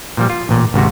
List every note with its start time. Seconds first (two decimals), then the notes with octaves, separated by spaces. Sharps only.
0.17 A#2 F3 G3
0.30 F4
0.49 A1 A#2
0.74 G#1 C#2 C3 F#4